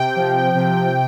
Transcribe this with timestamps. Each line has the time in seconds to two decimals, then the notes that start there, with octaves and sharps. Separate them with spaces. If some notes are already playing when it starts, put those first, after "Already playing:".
Already playing: C3 G5
0.16 F3
0.55 C3